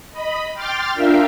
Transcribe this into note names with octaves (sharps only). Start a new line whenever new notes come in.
D#5 B5
G5 C6 D6 F6 A6
D4 F4 A#4 E5 F5 G5